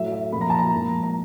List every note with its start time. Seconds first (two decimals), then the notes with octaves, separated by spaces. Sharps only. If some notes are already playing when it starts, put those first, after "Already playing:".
Already playing: A2 F#3 A3 E5
0.12 E5
0.32 A#2 F3 A#3 B5
0.41 A#5
0.50 A5
0.59 A#5
0.72 G#2 F3 A#3
1.03 A#5